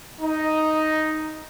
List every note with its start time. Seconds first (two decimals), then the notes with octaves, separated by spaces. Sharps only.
0.20 D#4